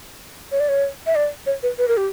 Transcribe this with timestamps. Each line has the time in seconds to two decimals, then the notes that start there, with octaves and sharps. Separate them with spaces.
0.52 C#5
0.60 D5
0.69 C#5
1.07 E5
1.15 D5
1.46 C#5
1.63 B4
1.78 B4
1.88 A#4
1.97 G4